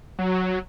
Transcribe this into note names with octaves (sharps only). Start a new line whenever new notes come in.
F#3